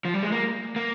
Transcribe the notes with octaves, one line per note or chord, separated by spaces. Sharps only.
F3
G3
G#3
A#3
A#3